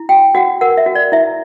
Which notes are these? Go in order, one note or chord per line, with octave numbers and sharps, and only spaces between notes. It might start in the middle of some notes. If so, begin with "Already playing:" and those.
Already playing: E4
F#4 G5
F#4 F#5
A#4 F#5
E5
F#4
D5
E4 E5